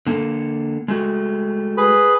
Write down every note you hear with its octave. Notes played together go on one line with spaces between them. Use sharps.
D3 A#3 A4
G#3 A3 F#4
G#4 B4 B5